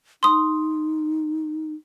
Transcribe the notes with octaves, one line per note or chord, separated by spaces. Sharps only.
D#4 C6 D#6